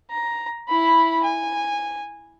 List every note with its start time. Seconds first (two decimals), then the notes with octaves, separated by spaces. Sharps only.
0.11 A#5
0.69 E4 B5
1.24 G#5